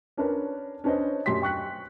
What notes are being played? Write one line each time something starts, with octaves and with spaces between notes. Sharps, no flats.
C#4 D4 A#4 B4
C#4 D4 B4 C5 D#5
F#2 G4 C6 B6
G5 C#6 F#6 B6